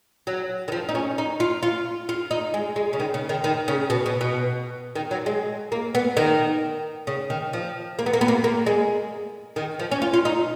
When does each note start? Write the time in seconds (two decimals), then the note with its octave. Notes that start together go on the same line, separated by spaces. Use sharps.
0.27 F#3
0.68 D#3
0.72 F3
0.89 D#4
0.95 C#4
1.18 D#4
1.40 F4
1.63 F4
2.09 F4
2.31 D#4
2.54 G#3
2.76 G#3
2.93 C#3
3.00 D#3
3.14 C#3
3.29 D#3
3.44 D#3
3.68 C#3
3.90 B2
4.06 B2
4.21 B2
4.96 D#3
5.11 F#3
5.26 G#3
5.72 A#3
5.95 B3
6.17 D#3
7.07 C#3
7.30 D#3
7.53 F3
7.99 A#3
8.06 B3
8.13 A#3
8.21 B3
8.28 A#3
8.44 A#3
8.66 G#3
9.56 D#3
9.79 F3
9.91 C#4
10.02 F4
10.13 F4
10.25 D#4